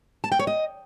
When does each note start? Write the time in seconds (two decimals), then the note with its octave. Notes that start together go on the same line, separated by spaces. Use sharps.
0.24 A5
0.32 G5
0.39 C#5
0.47 D#5